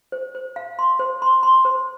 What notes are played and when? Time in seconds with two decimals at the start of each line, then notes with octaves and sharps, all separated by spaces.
0.12 C5
0.35 C5
0.56 F5
0.79 C6
0.99 C5
1.22 C6
1.43 C6
1.65 C5